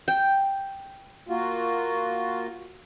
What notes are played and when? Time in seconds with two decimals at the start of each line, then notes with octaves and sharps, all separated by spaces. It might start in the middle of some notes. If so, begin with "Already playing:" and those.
0.08 G5
1.28 A#3 F4 F#4